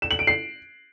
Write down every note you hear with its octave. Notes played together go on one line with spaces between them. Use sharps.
E7
F#7
D7
C7